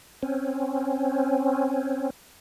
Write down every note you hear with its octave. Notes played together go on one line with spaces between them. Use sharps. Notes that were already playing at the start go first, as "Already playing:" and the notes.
C4 C#4